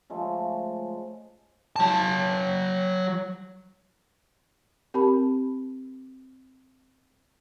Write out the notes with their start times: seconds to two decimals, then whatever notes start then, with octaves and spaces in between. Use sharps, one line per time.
0.10 C#3 F3 G#3 A3
1.76 F#3 A5
4.94 C4 G4 A#4 A5 B5